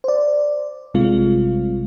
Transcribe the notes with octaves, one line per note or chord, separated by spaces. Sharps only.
C5 D5
A1 C3 G3 G#3 C4 F4